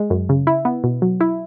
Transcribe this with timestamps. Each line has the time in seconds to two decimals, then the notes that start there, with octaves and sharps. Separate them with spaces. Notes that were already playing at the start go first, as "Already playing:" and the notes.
Already playing: G#3
0.10 F#2
0.29 C#3
0.47 E4
0.65 B3
0.84 B2
1.02 F#3
1.21 E4